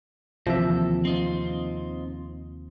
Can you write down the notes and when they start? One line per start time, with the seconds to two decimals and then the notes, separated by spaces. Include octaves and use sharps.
0.47 D#2 C3 E3 F3 A4 E5
1.05 C4 D#4 F4